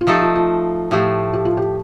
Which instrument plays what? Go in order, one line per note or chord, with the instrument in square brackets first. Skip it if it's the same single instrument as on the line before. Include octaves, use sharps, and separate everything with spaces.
[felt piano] F4
[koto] F3 A3 D#4 A4 [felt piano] G4
[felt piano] F4
F4
[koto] A2 F3 A3 [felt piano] G4
[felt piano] G4
F4
G4